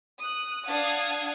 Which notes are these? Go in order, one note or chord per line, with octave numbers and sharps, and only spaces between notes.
D#6 F#6
D4 F5 F#5 A5 D#6 G#6